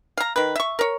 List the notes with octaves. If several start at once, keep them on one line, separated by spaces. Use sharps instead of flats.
F5 A#5
D#3 B4
E5 C#6
A#4 C#5